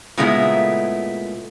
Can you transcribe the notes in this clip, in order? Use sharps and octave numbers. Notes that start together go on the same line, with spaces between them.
A#2 C#3 G#3 A3 B3 E4